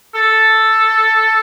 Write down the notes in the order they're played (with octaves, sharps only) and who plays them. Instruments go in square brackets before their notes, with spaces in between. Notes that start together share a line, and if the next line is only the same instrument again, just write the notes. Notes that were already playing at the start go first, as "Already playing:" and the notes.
[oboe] A4